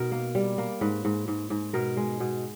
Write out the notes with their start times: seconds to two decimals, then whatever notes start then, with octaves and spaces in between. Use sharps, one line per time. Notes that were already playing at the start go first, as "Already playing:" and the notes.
Already playing: B2 D#4 A#4
0.12 A#3
0.35 G3
0.58 A#3
0.81 G#2 B4
1.05 G#2
1.28 G#2
1.50 G#2
1.73 B2 A#4
1.97 G#3
2.20 B2